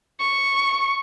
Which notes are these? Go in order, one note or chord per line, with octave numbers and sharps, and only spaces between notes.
C#6